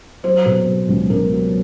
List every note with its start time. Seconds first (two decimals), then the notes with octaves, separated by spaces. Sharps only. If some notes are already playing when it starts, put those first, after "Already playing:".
0.23 F#3 C5
0.46 B2
0.67 B2
0.89 C#2
1.10 C#2 A#4
1.33 F#3